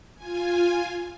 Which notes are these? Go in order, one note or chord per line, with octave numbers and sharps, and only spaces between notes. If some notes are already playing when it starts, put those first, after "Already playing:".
F4 G#5